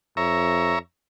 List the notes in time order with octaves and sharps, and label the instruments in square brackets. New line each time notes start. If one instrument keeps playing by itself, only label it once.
[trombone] F2 [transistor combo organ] C#5 E5 A#5